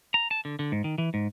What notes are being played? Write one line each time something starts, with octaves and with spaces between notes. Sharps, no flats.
A#5
A5
D3
D3
G#2
D#3
E3
G#2